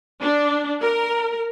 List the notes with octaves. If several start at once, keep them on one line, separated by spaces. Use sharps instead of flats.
D4
A#4